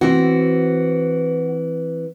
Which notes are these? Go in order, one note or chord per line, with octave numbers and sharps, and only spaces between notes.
E3 C4 F#4